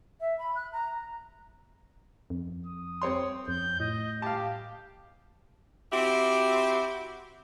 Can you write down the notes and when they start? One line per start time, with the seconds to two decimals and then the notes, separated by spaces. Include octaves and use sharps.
0.20 E5
0.39 B5
0.55 F#6
0.72 A#5
2.30 F2
2.66 D#6
3.02 C4 C#5 C6
3.48 F2 G6
3.80 A2 D#5
4.22 G4 F5 A5
5.92 C4 E4 F#4 G4